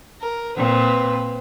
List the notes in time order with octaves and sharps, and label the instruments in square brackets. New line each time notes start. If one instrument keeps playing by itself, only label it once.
[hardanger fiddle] A#4
[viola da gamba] A#2 [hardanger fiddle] C4 B4